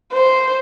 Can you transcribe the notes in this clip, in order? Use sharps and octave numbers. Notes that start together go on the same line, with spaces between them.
C5